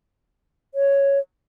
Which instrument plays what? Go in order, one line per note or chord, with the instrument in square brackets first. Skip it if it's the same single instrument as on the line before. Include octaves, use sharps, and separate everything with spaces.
[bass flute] C#5